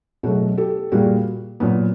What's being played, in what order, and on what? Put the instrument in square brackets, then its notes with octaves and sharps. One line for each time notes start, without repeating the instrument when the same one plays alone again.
[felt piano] B2 F#3 A3 F#4 G#4
G4 A4
A#2 G3 A#3 F#4 G#4
A#2 F#3 B3